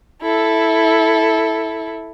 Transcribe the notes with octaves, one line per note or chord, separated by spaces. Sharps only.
E4 A4